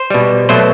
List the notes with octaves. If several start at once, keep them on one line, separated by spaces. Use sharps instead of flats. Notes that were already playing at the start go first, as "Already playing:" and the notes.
Already playing: C5
B2 G3
B2 F#3 A3 C5